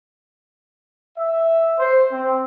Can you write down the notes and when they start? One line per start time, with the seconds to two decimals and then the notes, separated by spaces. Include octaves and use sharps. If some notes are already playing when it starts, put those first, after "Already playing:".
1.18 E5
1.79 C5
2.12 C4